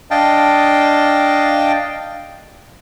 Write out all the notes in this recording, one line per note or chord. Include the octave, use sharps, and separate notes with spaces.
D4 D#5 F5 G5 A5